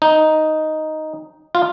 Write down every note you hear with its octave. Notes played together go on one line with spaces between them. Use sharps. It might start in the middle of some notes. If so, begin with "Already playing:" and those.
D#4
F4